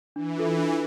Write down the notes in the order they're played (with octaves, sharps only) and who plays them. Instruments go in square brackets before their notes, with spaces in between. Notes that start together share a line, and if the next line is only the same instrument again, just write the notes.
[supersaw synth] E3 [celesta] D4
[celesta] F4 A4
D4